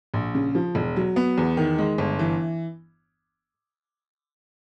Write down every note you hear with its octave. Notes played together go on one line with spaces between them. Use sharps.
A#1
C#3
F3
E1
F#3
B3
E2
D#3
G#3
G1
E3